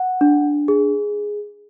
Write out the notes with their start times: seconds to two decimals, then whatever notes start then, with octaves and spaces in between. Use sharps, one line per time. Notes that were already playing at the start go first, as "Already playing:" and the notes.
Already playing: F#5
0.21 D4
0.68 G#4